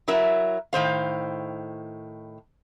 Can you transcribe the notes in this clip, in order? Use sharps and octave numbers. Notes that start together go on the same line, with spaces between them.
F#3 E4 A#4 E5
A2 D#3 C5 F5